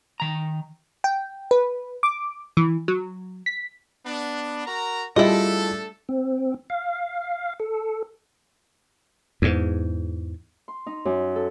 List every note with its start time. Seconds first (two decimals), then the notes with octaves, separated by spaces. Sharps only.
0.20 D#3 A#5
1.04 G5
1.51 B4
2.03 D6
2.57 E3
2.88 F#3
3.46 B6
4.05 B3 D4
4.66 F#4 A#4 A#5
5.16 G3 A3 D4 E4 F4 G#4 A4 D#5
6.09 C4
6.70 F5
7.60 A4
9.42 E2 G#2
10.68 C6
10.87 D#4
11.05 F#2
11.36 A4